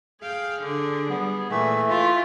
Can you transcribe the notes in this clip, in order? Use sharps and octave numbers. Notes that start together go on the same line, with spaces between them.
G#4 F5 G5
D3 D4
G3 B3
A#2 E3 A3 E5
E4 F4 E5